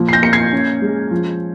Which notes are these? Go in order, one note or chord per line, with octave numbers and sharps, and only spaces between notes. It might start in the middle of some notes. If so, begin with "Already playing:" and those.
Already playing: A#2 F3
C7
G6 A#6
A#3 C#7
G#6 C7
C#4
G#3
F3